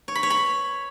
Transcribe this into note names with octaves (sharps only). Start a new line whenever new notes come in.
C#5
B5
C#5
B5